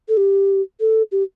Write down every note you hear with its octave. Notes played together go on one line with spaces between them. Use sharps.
A4
G4
A4
G4